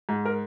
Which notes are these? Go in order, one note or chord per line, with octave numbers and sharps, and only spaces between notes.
G#2
A#4